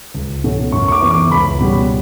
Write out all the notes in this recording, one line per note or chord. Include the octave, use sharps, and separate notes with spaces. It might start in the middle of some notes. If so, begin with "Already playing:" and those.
C#2
B2 A3 C#4
F#2 C#6
C#6
D6
E3 B3
D6
C#2 B5
B2 G3 C#4